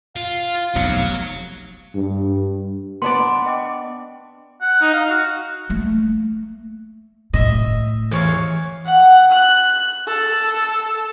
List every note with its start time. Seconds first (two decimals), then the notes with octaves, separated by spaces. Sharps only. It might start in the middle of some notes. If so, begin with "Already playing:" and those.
0.16 F4 F5
0.75 F1 B1 C3 F#3
1.95 G2
3.02 B3 D4 D5 C6
3.46 D#5 G5 D6
4.61 F#5
4.81 D#4
4.94 F5
5.10 F#4
5.70 A3 A#3
7.33 A2 D#5 E5
8.11 E2 C#5 F5
8.85 F#5
9.31 F#6
10.07 A4